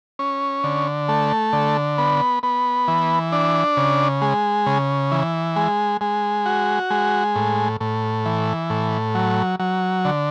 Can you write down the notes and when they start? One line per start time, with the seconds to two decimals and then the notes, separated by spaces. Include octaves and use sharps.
0.19 C#4
0.64 D3
1.09 A3
1.53 D3
1.98 B3
2.43 B3
2.88 E3
3.32 D4
3.77 C#3
4.22 G#3
4.66 C#3
5.12 E3
5.56 G#3
6.01 G#3
6.46 F#4
6.90 G#3
7.36 A2
7.80 A2
8.25 E3
8.70 A2
9.15 F#3
9.60 F#3
10.05 D3